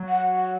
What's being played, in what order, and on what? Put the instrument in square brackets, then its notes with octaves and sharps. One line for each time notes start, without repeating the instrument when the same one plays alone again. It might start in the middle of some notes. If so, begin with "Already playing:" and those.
Already playing: [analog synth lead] F#3
[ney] F#5